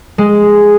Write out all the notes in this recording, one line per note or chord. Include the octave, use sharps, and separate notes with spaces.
G#3